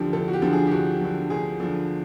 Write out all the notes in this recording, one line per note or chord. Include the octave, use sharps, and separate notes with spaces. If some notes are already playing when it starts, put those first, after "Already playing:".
Already playing: D2 D3 F3 G4
D2 A4
F#4
G4
D3 F3
G#4
G4
D2 F#4
D3 F3
D2 G#4
D3 F3